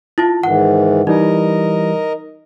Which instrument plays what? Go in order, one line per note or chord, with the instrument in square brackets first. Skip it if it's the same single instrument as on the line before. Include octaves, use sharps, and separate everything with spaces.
[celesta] E4 F4 A5
[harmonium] G#2 D#3 E3 [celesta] F#5
[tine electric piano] E3 G3 [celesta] D#4 [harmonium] A#4 D#5